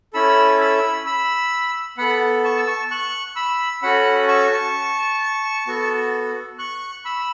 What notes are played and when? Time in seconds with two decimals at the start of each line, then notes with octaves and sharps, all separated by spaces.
0.13 C#4 E4 A4 B5 E6
0.61 B5 E6
1.06 B5 E6
1.98 B3 A4 F#5 B5
2.44 A5 C#6
2.57 E6
2.67 A5 C#6
2.91 C#6 F#6
3.36 B5 E6
3.82 C#4 F#4 A4 F#5 B5
4.28 A5 C#6
5.67 B3 F#4 A4
6.59 C#6 F#6
7.05 B5 E6